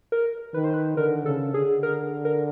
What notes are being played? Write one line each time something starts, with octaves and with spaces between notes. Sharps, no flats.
A#4
D#3 B4
C5
B4
D3 A#4
C#3 A4
D3 G#4
A#4
A#4